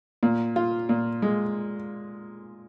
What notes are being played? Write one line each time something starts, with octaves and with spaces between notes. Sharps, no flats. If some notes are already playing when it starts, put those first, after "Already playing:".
A#2
F4
A#2
G#3